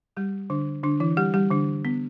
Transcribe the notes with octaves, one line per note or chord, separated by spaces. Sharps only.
G3 G4
D3 D4
D3 D4
E3 E4
G3 G4
G3 G4
D3 D4
B3